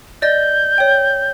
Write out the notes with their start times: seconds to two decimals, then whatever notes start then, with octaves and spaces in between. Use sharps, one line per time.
0.22 D5 D#5 G6 A6
0.78 C#5 G5